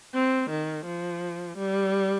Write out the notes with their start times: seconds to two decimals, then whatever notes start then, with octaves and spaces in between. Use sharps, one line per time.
0.15 C4
0.50 D#3
0.86 F3
1.58 G3